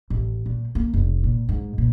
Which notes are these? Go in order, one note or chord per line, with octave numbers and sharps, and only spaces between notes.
A1
A#2
A#3
F1
A#2
G#2
A#2